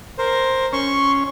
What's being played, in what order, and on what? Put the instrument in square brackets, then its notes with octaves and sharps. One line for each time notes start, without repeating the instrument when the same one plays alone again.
[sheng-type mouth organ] A#4 C5
[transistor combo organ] C#4 [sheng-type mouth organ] C6 C#6